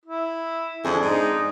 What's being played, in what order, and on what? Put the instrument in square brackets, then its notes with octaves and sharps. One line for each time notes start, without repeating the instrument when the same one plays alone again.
[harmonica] E4
[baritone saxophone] F2 [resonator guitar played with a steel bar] D4 G#4
[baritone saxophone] G#2 [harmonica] D#4